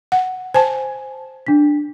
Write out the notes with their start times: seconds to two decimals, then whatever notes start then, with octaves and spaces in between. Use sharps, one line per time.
0.12 F#5
0.54 C5 G#5 A5
1.47 D4 B6